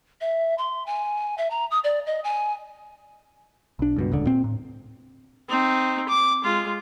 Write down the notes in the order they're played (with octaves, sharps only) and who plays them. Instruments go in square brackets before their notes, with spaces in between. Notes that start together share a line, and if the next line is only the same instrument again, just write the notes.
[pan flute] E5
C6
G#5
E5
A#5
D#6
D5
D#5
G#5
[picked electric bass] B1 D4
C#2 G2 B2
D#1 C#2 D3
A#2 C4
A2
[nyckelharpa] C4 D#4
D6
G#3 F4